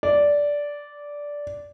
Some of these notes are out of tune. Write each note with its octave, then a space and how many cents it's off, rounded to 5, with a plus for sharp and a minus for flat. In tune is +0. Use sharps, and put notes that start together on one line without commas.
D5 -10